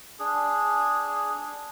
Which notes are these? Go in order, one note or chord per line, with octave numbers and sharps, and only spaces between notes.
D4 G#4